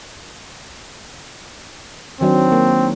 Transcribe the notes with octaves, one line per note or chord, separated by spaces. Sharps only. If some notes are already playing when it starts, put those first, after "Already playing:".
D#3 F#3 C4 D4
A#3